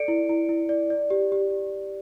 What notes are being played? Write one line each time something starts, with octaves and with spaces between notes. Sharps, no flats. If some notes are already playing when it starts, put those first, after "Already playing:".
Already playing: A4 D5 C#7 D7
E4
E4
E4
D5
D5
G4
G4